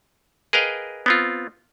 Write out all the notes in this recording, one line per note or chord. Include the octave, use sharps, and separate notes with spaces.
G#4 A#4 B4 D#5 F5 G5
B3 C4 F4